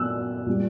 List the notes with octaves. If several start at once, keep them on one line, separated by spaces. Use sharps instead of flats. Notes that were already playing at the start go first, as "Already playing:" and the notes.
Already playing: A#2 F#3 E6 F#6
A#2 G3